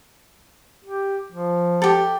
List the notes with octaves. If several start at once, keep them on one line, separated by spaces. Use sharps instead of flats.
G4
F3
G4 A4